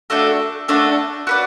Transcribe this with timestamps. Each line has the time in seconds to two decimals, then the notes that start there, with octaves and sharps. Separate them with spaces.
0.10 A3 D4 F#4 A4
0.68 A3 D4 F#4 A4
1.27 F#4 B4 D5